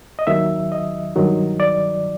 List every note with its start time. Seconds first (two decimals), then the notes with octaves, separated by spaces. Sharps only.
0.19 D#5
0.27 D#2 D#3 F#3 E5
0.72 D#5
1.16 G2 D#3 F#3
1.60 D5